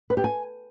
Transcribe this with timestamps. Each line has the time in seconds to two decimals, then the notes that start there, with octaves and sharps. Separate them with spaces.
0.10 B4
0.17 G4
0.24 G#5